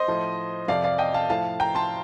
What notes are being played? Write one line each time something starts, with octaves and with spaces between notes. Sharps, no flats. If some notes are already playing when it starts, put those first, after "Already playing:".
Already playing: C5 D#5
A2 F3
F2 C3 F3 D5 F5
D5 F5
D#5 G5
F5 A5
A2 F3 F5 A5
G5 A#5
A5 C6